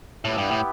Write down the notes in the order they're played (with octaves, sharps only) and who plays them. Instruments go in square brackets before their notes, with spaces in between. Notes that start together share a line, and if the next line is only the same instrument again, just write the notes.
[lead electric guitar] A2 [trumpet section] B3 E4 G4
[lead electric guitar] G2
A2